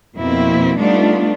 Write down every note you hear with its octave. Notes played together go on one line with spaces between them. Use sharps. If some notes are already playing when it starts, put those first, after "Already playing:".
F2 B2 A#3 C4 E4
G3 A3 B3 D4 D#4 F4